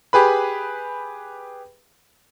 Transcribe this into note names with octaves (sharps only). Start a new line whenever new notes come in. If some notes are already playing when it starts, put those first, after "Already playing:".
G4 G#4 B4 B5